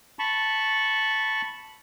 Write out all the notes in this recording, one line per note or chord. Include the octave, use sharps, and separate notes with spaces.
A5 B5 C#6